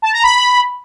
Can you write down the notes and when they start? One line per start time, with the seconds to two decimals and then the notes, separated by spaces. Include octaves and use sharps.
0.02 A5
0.13 A#5
0.23 B5